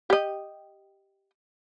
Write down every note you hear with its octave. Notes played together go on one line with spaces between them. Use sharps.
G4 D#5